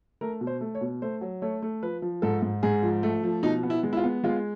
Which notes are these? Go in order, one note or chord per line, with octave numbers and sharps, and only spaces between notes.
A3 A#4
B2
C5
A3
C#5
B2
A3 C5
F#3
A3 C#5
A3
F3 B4
F3
G#2 A4
G#2
G#2 G#4
F3
A3
F3
B2 D#4
B3
E4
G#3
E4
F4
B3
G#3 F4